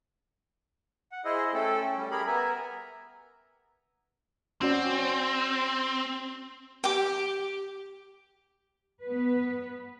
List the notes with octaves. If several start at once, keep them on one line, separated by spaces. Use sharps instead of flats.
F#5
E4 G#4 C5 D#5 E6
A3 C#4 A4 G5
G3
G4 G#4 A#4 B5
B3 A#4 E5 G#5 A#5
C4 C#4 F#4 D5
G4 G5 D6
B3 B4